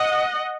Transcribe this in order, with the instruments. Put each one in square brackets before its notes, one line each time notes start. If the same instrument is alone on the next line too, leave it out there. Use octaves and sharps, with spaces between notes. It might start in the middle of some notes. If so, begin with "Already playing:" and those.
Already playing: [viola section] D#5 F#5